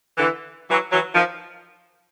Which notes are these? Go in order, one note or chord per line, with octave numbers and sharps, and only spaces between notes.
D3 E3
E3 F#3
E3 F#3
D#3 F3